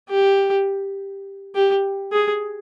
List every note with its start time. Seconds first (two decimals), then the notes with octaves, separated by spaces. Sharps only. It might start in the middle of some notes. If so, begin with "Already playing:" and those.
0.09 G4
1.55 G4
2.12 G#4